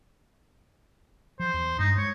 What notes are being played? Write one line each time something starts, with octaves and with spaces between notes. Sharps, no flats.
F3 C5
E2
G2 G#3 D#4
G#3 C#5